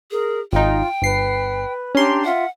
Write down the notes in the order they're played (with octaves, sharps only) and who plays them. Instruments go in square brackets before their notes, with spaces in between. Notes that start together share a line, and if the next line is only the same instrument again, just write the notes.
[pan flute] G#4 [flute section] A#4
[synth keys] G#1 D#4 [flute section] F4 [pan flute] G5
[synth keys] G1 C7 [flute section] B4
[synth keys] C#4 C6 [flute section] D4 G4 A#5
[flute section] F4 E5 [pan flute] F#5